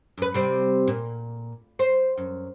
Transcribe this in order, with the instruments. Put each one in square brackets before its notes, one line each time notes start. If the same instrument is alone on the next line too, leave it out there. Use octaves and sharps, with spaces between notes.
[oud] F#2 B4
C3 G3 C4
A#2
C5
F#2